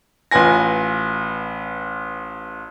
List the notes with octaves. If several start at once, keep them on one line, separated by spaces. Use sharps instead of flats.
A1 F4 B4 G#5 A#6